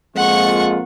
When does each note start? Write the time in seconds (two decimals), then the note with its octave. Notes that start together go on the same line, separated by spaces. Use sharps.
0.16 F2 G#3 A#3 F4 F#5 C#6